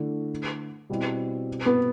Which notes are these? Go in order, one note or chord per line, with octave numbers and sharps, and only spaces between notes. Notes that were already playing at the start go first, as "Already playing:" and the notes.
Already playing: D3 A3 E4
B2 G3 C4 E4
B3